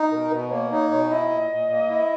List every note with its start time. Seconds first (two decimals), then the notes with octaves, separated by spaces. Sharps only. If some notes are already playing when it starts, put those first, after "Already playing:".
Already playing: D#4
0.11 B2 A#4
0.31 B2 B4
0.51 A#3 C#5
0.71 D#4 C#5
0.90 B2 C#5
1.04 C#5
1.10 E4 D#5
1.30 A#2
1.50 A#2
1.70 A#3
1.90 E4